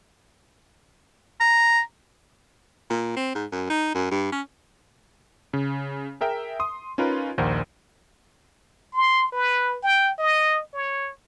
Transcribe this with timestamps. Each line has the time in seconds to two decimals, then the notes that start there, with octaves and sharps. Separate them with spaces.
1.40 A#5
2.90 A#2
3.16 C4
3.35 G#2
3.52 F#2
3.70 D#4
3.95 F#2
4.11 G2
4.32 C#4
5.53 C#3
6.21 G#4 A#4 E5 G5
6.60 C6 D#6
6.98 C#4 D#4 F4 A#4 B4
7.38 A#1 D#2 A#4 C5 F#5
8.94 C6
9.32 B4
9.83 G5
10.19 D#5
10.74 C#5